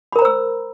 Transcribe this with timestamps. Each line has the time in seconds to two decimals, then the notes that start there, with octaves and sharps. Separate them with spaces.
0.12 B5
0.16 A#4
0.19 A#5
0.22 C5
0.25 E6